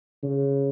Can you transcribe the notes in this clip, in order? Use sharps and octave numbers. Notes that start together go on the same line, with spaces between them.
C#3